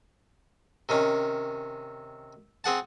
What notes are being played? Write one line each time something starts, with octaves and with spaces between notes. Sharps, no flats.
C3 D#3 C#4
C4 G#4 F#5 A5